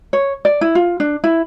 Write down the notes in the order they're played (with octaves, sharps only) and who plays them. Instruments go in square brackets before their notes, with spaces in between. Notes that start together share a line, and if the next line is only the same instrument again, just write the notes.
[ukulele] C#5
D5
E4
F4
D4
E4